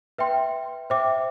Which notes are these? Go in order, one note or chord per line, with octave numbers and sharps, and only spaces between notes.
B4 E5 G5 C6
C5 E5 G5 D6